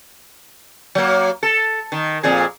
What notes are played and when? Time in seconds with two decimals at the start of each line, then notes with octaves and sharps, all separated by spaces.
0.95 F#3 A#3
1.43 A4
1.92 D#3
2.23 F2 A#2 G#4